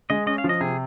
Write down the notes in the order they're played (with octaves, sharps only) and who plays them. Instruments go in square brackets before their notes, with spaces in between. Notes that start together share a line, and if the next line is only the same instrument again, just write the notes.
[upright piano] G#3 [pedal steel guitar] D#5
[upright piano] C#4 [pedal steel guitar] D#5
[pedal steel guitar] F5
[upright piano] F3
[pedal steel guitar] D#5
[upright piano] C3 [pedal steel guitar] G#4